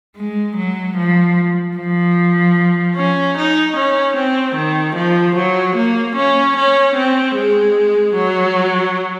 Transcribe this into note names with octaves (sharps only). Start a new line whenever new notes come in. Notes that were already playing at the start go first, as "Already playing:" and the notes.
G#3
F#3
F3
F3
C#4
D#4
C#4
C4
D#3
F3
F#3
A#3
C#4
C#4
C4
G#3
F#3